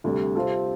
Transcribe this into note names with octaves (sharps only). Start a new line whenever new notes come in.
D2 C3 G3
C3 G3 C4 F4 A4